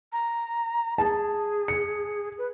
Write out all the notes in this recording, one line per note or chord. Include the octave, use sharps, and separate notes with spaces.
A#5
G#4 A5
C#7
B4